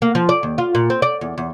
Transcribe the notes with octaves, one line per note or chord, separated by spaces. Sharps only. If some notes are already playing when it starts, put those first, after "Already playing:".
A#3
F3
D5
D#2
F4
A#2
C4
D5
E2
E2